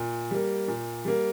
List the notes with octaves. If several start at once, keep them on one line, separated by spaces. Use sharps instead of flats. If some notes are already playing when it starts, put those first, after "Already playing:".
Already playing: A#2
G3 A#3
A#2
G3 A#3